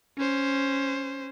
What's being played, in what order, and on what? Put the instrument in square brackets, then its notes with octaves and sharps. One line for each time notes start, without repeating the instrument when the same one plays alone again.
[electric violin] C#4 C5